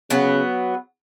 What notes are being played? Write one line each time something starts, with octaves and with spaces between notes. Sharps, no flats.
C#3 F#3 B3